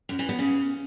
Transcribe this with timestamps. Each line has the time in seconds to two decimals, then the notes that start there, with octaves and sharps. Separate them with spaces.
0.09 F#2
0.19 E3
0.29 B3
0.39 C#3